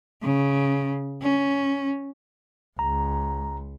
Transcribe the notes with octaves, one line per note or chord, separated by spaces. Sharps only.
C#3
C#4
C#2 A#5